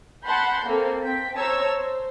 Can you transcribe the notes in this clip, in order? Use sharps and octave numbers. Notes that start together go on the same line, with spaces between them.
F#5 A5 B5 C6 G6
A#3 C4 A4 C5
C4 G5 B6
C5 C#5 A5 A#5 E6 G#6
C5